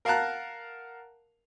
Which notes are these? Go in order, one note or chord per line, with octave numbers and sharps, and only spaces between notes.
A#4 F5 F#5 A5 A#5 F#6